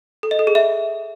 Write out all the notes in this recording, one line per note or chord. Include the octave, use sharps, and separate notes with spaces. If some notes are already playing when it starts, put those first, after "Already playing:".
A4
D#5
A4
G#4
E5